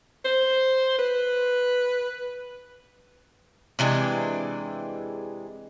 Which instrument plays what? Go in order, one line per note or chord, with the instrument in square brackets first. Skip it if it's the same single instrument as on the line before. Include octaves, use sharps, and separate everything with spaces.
[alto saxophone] C5
B4
[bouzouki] C3 E3 G#3 D4